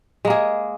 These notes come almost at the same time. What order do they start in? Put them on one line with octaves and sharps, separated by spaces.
G#3 A#3 G#4